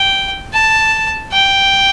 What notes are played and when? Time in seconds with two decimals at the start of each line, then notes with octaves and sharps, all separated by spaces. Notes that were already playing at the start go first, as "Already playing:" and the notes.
Already playing: G5
0.53 A5
1.32 G5